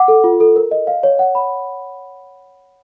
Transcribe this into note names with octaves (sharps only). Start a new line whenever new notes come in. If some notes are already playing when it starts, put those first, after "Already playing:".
Already playing: F#5 D6
A4
F4
A4
A#4
D#5
F5
C#5
F#5
B5